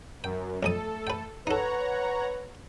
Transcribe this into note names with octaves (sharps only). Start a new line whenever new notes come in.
F#2 A#4 G5
B1 F2 A3 A4 D#6
B4 G5
D#4 A4 B4 C#5 F#5 A#5